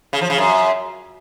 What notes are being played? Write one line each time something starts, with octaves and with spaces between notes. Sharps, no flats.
C#3
F3
C#3
F#2